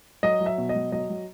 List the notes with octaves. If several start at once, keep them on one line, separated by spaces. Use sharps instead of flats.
F#3 D#5
F#3
E5
B2
D#5
F#3
F#3 D#5
F#3